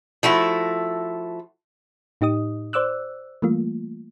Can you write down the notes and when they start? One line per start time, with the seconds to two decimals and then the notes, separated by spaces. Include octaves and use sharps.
0.23 F3 A3 E4 F#4
2.21 A2 D#4 G4 D#5 D#6
2.73 C5 D5 D6 E6 F#6
3.42 E3 G3 A3 A#3 F4